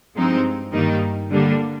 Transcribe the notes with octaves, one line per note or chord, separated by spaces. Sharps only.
G2 F3 G#3 C4 D#4
G2 D#3 G3 A#3 D#4
D3 G3 A#3 D4